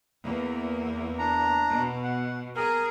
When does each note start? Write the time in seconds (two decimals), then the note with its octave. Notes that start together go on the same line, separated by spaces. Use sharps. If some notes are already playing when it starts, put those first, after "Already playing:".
0.23 E2 A#3
1.18 D4 A#5
1.69 B2
2.04 F#5
2.56 G#4 A#4